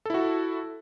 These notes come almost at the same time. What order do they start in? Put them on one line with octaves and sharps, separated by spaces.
A4 E4 F#4